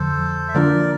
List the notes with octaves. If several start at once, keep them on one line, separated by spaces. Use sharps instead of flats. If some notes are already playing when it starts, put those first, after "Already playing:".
Already playing: F2 D3 F3 A4 C5
E5
D3 F3 A#3 D4 F4 A#4 D5